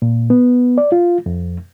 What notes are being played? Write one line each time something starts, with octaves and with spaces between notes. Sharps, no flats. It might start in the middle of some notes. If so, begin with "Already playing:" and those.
A#2
B3
D5
F4
F2